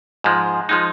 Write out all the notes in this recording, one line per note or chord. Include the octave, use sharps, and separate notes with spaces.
G#2 F3 G#3
F3 G#3 D#4